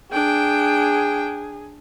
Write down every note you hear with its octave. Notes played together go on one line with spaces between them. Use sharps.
D4 G#4 G5